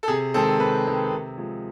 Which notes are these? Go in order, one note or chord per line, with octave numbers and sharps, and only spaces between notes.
A4
C3 G#4
D#3 G#3 C4 A4
C3 B4
D#3 G#3 C4
C3
F3 G#3